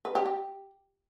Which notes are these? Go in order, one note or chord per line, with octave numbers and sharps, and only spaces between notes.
B4
G4
G4